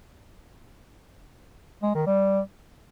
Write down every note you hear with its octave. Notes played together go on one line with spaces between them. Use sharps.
G#3
D#3
G3